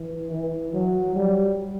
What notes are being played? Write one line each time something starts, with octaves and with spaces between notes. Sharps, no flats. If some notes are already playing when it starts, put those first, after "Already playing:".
Already playing: E3
E3
F#3
G3